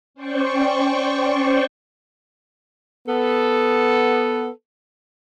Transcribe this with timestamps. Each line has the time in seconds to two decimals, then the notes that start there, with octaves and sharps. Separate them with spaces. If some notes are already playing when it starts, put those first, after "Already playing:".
0.14 C#4 C5 D5 G5 C#6
3.08 B3 A4